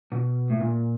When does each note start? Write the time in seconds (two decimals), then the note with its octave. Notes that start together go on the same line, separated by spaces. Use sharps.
0.12 B2
0.50 A2
0.60 A#2